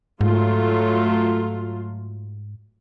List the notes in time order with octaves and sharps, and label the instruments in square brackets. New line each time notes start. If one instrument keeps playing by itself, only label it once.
[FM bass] G#2 [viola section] F#3 A3 F4